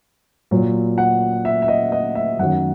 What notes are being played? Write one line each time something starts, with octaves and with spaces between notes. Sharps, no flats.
A#2 F#3
F#5
E5
E5
D#5
D#5
E5
F#2 D#3 F#3 F#5